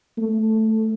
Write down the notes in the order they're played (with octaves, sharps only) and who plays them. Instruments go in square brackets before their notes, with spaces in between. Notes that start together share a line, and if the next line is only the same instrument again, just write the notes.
[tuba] A3